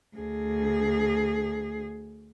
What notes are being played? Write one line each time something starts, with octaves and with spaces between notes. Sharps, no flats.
D2 G#4